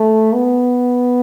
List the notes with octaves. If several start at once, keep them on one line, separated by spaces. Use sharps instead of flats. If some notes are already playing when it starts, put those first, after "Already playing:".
Already playing: A3
B3